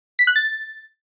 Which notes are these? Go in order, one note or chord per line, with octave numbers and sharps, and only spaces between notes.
B6
F#6
A6